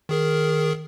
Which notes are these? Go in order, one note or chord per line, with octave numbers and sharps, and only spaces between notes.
D#3 G#4 A#4